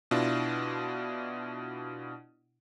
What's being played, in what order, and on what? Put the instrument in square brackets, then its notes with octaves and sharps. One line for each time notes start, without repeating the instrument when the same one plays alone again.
[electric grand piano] B2 D4 E4 F4